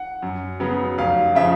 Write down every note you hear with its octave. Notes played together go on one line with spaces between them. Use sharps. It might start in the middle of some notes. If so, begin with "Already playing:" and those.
Already playing: F#5
F#2
C#3 F#3 B3
F1 F5
C#3 F3 E5